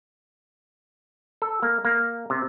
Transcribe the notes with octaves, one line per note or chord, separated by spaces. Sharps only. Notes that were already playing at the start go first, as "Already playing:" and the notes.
A4
A#3
A#3
C3